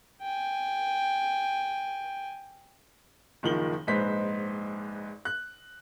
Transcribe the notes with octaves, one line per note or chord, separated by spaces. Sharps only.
G5 G#5
F#1 D#3 F3 F#7 G7
A#1 G#2 D#4 B4 C5 B6
F#6